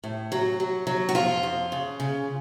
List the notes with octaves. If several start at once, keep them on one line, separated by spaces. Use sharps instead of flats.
A2
F#3
F#3
F#3
F#4
F2 F4
F2
C#3
C#3